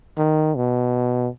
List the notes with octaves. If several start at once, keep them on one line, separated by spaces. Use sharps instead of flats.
D#3
B2